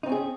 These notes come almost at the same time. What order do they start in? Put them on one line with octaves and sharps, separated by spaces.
D#4 C4 C#4 G#4